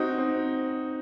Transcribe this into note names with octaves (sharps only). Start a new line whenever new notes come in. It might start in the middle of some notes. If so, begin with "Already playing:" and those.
Already playing: C4 D#4 F#4
C4